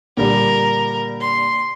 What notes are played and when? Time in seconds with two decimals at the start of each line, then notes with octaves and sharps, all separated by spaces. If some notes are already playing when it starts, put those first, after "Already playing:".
0.17 A#2 D3 G3 A#4
1.21 C6